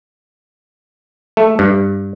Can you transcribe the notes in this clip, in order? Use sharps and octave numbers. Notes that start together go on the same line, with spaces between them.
A3
G2